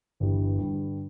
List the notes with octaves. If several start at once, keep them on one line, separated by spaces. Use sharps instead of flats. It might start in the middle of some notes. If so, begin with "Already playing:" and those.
G1 G2 E3 G3
G2 D3 G3